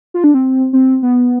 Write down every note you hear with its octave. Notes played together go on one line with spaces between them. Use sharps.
F4
D4
C4
C4
B3